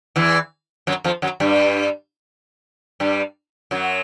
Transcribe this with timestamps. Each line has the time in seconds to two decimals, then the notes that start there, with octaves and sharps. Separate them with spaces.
0.16 E2 E3
0.87 F#2 F#3
1.04 F2 F3
1.22 F#2 F#3
1.40 G2 G3
3.00 G2 G3
3.71 F#2 F#3